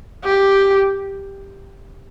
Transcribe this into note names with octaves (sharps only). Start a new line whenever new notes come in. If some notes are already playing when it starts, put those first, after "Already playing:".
G4